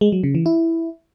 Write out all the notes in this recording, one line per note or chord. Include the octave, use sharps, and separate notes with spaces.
G#3
F#3
C#3
E3
E4